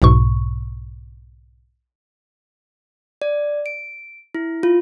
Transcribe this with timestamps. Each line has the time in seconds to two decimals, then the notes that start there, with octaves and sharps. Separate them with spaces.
0.02 B1 G#2 B2 C#6
3.22 D5
3.66 D7
4.35 E4
4.63 F4